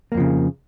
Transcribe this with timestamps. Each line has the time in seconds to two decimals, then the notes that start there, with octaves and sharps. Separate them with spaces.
0.12 A#3
0.14 F2
0.17 F3
0.20 C#3